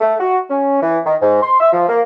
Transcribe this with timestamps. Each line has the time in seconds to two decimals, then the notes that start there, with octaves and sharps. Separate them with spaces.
0.01 A3
0.20 F#4
0.50 C#4
0.82 E3
1.06 D#3
1.22 G#2
1.43 C6
1.60 E5
1.73 F3
1.89 A#3